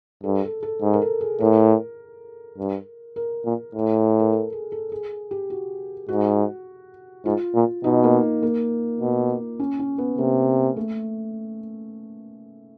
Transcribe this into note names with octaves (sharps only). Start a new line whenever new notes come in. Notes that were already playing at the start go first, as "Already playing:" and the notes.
G2 A4
A4
A4
G#2
A#4
A4
G#4
A2 A#4
G2
A#4
A#2
A2
A#4
A4
G#4
A4
G#4
G4
F#4
G#2 F#4
G#2 F4
A#2
B2 D#4
A#3
A#3
B2
C#4
C#4
B3
C3 A#3
A3